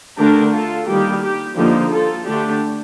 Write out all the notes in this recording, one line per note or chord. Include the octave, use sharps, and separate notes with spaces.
D3 A3 D4 G4 A#4
F4 A4
D#3 G3 A#3 G4
G4
D3 F3 A#3 D#4 G4
F4 A4
D3 A3 D4 G4